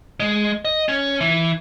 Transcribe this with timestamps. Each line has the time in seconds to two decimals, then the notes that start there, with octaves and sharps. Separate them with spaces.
0.20 G#3
0.65 D#5
0.89 C#4
1.21 E3